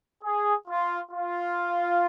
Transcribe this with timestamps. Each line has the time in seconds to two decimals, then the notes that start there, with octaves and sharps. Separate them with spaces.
0.23 G#4
0.68 F4
1.12 F4